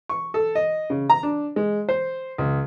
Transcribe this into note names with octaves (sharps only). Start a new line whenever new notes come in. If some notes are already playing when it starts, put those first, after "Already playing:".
C#6
A4
D#5
C#3
A#5
D4
G#3
C5
C#2